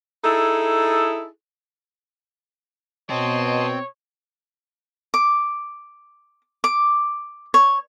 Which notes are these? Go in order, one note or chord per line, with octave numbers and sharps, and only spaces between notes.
D#4 E4 G#4 A4
B2 C4 C#5 D#5 A5 C6
D6
D6
C#5